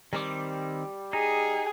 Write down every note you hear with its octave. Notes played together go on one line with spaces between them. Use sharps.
D#3 G3 C4 D6
D#4 G#4